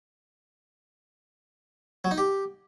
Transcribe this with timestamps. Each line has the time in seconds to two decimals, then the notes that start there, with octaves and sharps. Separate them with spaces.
2.04 F#3
2.11 D#4
2.18 G4